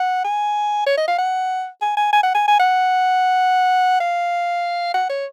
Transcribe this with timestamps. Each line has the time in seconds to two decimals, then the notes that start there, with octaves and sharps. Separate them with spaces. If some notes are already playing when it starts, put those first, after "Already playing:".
Already playing: F#5
0.24 G#5
0.87 C#5
0.97 D#5
1.08 F5
1.18 F#5
1.81 G#5
1.97 G#5
2.13 G#5
2.23 F#5
2.35 G#5
2.48 G#5
2.59 F#5
4.00 F5
4.94 F#5
5.10 C#5